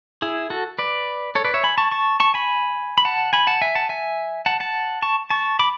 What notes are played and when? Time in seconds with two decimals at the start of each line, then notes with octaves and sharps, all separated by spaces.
0.22 E4 G#4
0.50 F#4 A4
0.78 B4 D5
1.35 A4 C#5
1.45 B4 D5
1.54 C#5 E5
1.63 G#5 B5
1.78 A5 C#6
1.92 A5 C#6
2.20 A5 C#6
2.34 G#5 B5
2.98 B5
3.05 F#5 A5
3.33 G#5 B5
3.47 F#5 A5
3.62 E5 G#5
3.75 F#5 A5
3.89 E5 G#5
4.46 F#5 A5
4.60 F#5 A5
5.02 A5 C#6
5.30 A5 C#6
5.59 B5 D6